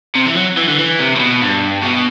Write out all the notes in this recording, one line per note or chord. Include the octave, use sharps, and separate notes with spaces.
C3
E3
F#3
E3
D3
E3
C3
A2
B2
G2
B2